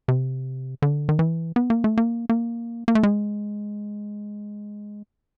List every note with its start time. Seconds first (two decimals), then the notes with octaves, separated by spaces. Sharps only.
0.08 C3
0.82 D3
1.09 D#3
1.19 E3
1.56 B3
1.70 A#3
1.84 A3
1.97 A#3
2.29 A#3
2.88 A#3
2.95 A3
3.03 G#3